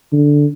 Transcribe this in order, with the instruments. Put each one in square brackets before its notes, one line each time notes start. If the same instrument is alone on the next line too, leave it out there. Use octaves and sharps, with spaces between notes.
[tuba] D3